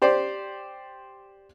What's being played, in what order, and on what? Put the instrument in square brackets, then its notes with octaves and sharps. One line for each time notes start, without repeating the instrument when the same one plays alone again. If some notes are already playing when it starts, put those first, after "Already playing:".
[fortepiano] G4 C5 D5